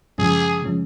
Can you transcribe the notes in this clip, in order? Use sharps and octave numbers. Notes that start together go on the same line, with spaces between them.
F#2 C#3 F3 G#3 C#4 G#4
C#3 F3 G#3 C#4